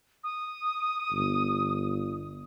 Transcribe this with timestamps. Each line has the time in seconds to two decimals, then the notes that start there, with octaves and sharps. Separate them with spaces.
0.24 D#6
1.12 G1